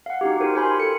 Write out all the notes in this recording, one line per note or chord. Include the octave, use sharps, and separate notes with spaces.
F5 F#5
D#4 F#4 G4
F4 G4 A#4 C5
G4 A#4 C5 G#5 B5 C6
A4 B5 C#7